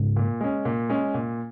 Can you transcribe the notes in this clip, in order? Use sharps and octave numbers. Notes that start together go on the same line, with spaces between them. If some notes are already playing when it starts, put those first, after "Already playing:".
Already playing: G#2 C#3
A#2
G#3 C#4
A#2
G#3 C#4
A#2